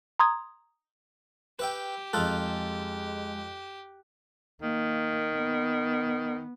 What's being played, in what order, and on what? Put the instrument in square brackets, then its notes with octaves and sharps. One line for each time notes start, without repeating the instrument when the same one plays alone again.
[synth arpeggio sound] A#5 C6 D#6 G#6
[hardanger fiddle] G4 [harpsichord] B4 E5 G5
[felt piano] F2 F#6 [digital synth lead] G#3 [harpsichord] D#4 F4 A4
[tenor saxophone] D#3 [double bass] A#3
[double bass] B3